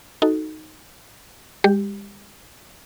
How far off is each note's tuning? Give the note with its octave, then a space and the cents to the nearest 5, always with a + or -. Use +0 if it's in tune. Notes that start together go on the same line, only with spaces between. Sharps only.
D#4 +0 F#4 +0 A4 +0
G#3 -45 G4 +0